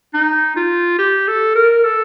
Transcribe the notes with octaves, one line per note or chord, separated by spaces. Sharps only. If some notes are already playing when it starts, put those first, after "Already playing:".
D#4
F4
G4
A4
A#4
A4